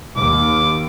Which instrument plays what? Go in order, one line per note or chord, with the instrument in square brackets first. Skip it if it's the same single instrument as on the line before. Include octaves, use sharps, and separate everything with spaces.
[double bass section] D#2 [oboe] D6